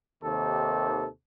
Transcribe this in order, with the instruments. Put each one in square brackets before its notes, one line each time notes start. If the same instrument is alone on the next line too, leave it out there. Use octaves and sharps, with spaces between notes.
[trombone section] D#2 C3 D#3 A4